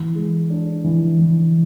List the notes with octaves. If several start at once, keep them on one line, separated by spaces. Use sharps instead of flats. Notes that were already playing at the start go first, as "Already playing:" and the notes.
Already playing: E3
G#3
D4
E3
E3